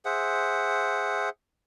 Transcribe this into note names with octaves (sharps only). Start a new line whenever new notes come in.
G#4 C5 E5 F#5